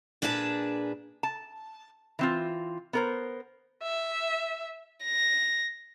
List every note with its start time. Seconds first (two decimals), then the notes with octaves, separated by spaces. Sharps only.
0.22 A#2 D4 G#4 B4 D5 A5
1.23 A5
2.19 E3 C4 F4
2.93 B3 A#4 C5
3.83 E5
5.04 A#6